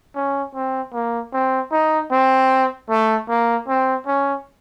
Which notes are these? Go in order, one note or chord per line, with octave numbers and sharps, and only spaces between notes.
C#4
C4
A#3
C4
D#4
C4
A3
A#3
C4
C#4